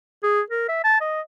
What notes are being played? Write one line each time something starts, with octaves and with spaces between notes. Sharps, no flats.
G#4
A#4
E5
A5
D#5